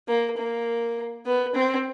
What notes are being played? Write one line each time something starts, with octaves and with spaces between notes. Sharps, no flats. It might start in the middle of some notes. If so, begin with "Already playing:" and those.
A#3
A#3
B3
C4